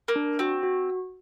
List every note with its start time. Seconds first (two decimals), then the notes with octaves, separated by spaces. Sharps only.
0.08 A#3
0.16 D4
0.39 C4 F#4
0.63 F#4